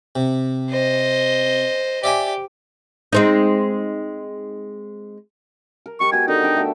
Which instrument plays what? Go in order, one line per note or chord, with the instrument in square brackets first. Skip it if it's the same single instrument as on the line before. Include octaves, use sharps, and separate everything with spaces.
[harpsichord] C3
[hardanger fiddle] C5 D#5
[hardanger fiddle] G4 [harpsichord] D5 E5 G#5
[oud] G#3 C4 D#4
[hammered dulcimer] A#4
[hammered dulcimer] G#3 G4 A#4 [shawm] C#6
[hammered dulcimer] B3 F#4 G4 [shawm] G#5
[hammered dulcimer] D3 D#3 G4 [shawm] D#4
[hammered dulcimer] D4 D5 G5
A3 F#4 E5